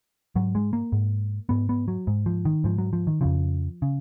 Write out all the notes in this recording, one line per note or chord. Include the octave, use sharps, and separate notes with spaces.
G#2 F#3
G#3
A#3
G#2
G#2 B3
B3
F#3
G#2
F3
D#3
G#2 F3
F#3
F3
D#3
F2 C#3 F3
C#3